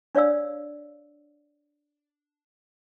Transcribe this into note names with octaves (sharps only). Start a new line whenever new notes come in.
D4 C#5 D5 F5 E6